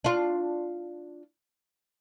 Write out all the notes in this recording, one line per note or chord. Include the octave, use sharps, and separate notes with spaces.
D4 F4